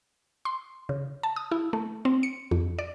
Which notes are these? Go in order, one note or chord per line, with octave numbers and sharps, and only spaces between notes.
C6
C#3
A5
D#6
E4
A3
C4
C#7
F2
D5